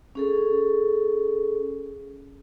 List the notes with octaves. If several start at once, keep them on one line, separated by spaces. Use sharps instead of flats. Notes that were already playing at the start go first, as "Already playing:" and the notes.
C#4 G#4 A4